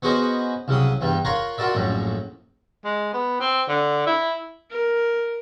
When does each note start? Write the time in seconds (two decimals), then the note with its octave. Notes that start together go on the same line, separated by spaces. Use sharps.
0.02 B3 C#4 F#4 G#4 C5 D#5
0.68 C2 C#3 F#3 D#6
1.01 E2 G2 G3
1.25 F4 A#4 C#5 F5 F#5 A#5
1.58 F4 F#4 A#4 D5 E5
1.75 A#1 F#2 A2
2.84 G#3
3.13 B3
3.40 C4
3.68 D3
4.06 E4
4.70 A#4